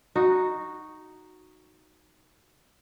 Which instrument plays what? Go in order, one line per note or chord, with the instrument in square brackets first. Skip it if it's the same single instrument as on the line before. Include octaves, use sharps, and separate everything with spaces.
[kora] D#4 F#4